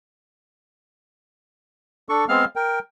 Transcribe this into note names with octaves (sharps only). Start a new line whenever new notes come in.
D4 A4 C#6
G#3 B3 C4 F5 F6
A#4 G5